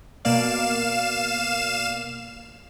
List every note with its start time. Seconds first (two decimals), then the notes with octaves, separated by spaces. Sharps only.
0.25 B2 A#3 D5 F5 E7